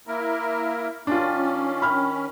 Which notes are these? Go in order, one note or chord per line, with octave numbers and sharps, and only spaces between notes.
A#3 E4 A#4
D#3 C#4 D4 F4
B5 F6